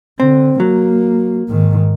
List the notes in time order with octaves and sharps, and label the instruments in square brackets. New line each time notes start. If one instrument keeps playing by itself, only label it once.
[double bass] D3 [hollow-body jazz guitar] C4
[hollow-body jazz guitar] F#3 [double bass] A#3
[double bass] G#2 D#3